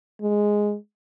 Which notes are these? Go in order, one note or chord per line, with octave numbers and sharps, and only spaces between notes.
G#3